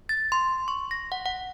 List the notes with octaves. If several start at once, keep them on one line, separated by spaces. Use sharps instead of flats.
A6
C6
C#6
A#6
F#5
F#5